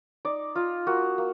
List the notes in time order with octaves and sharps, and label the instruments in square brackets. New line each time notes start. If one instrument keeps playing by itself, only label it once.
[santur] D#4 D5
D#4 F4
A#3 F#4
A#3